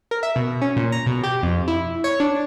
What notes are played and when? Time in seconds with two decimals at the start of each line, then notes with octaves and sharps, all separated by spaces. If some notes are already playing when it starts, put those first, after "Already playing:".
0.11 A#4
0.23 E5
0.36 B2
0.62 C#4
0.76 A#2
0.92 A#5
1.06 B2
1.23 G4
1.43 F2
1.68 E4
2.04 C#5
2.20 D4